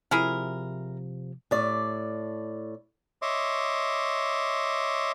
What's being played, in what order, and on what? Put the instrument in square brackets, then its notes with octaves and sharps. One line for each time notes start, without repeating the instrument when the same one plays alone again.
[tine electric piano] C3 F3 [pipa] E4 G#4 A#4
[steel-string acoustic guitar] A2 D5
[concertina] C#5 D#5 E5 C6 D6